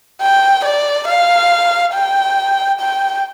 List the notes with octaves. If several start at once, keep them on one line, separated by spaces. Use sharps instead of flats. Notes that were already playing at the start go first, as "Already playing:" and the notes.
G5
D5
F5
G5
G5